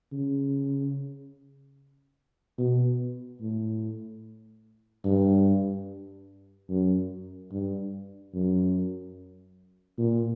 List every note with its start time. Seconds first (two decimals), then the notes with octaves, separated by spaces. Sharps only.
0.12 C#3
2.58 B2
3.41 A2
5.05 G2
6.69 F#2
7.51 G2
8.34 F#2
9.98 A#2